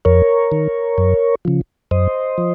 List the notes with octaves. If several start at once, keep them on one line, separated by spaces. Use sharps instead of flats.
F2 A#4 C#5
D#3
F#2
C#3 F3
F#2 C5 D#5
F3